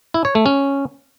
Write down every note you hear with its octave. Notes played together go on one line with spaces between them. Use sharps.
E4
C#5
A3
C#4